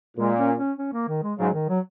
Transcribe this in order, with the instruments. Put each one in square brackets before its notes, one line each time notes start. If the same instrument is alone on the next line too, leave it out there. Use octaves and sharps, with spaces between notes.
[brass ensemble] A#2 [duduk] G#3
[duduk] C#4
C#4
C#4
A#3
D#3
G#3
[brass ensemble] G#2 C#3 [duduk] F#3
[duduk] D#3
F#3